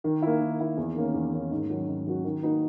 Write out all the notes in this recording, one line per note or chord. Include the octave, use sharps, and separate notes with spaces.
D#3
A#3 E4
D#3
A#3 E4
E2
D#3 A#3 C#4
E2
D#3 A#3 C#4
G#2
D#3 F#3 C#4 F#4
G#2
D#3 F#3 C#4 F#4
D#3
A#3 D#4 F#4 B4